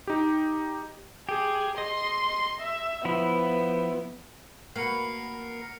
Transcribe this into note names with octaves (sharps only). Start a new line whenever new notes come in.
D#4 G4
G4 G#4
D#5 C6
E5
F3 B3 E4
A#3 F#4 A#4 B4 C7 C#7